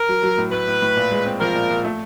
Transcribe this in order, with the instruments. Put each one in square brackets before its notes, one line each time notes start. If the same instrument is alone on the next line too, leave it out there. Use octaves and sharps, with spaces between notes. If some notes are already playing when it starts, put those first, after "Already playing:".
Already playing: [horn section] A#4
[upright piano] F#3
F#3
A2
[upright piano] A2 [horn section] B4
[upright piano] A2
A2
A#2
G#3
C4
[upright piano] F3 [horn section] A#4
[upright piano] A#2
A#2
A3